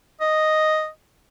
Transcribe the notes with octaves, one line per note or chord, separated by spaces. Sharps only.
D#5